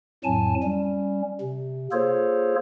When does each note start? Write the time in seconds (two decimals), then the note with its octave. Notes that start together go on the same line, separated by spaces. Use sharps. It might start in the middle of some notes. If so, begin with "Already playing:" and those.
0.24 F2 A2 F#3 G#5 A5
0.63 G3 C#4
1.41 C3
1.92 A#3 F4 G#4 A4 C5 C#5